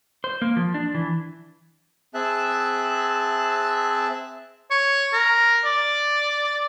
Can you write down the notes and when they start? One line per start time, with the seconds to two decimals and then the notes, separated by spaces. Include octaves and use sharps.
0.24 C5
0.42 A#3
0.56 F3
0.74 D4
0.94 E3
2.14 C4 G#4 E5 A5 F#6
4.71 C#5
5.13 A#4
5.65 D5